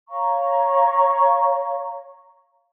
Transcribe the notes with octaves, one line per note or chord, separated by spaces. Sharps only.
C#5 F5 A#5 C#6